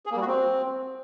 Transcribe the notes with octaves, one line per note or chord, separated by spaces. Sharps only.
G#4
A#3
G3
F#4
C4